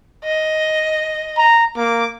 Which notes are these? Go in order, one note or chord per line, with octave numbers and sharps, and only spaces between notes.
D#5
A#5
A#3 D6